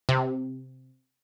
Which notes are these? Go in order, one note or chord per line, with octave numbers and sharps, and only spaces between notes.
C3